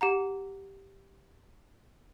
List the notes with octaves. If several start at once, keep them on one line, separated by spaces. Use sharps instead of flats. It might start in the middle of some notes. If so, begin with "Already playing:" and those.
G4 F#5 A#5